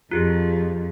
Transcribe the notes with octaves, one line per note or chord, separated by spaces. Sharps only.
F2 F4 G4 G#4